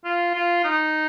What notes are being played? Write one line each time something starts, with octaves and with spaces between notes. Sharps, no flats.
F4
F4
D#4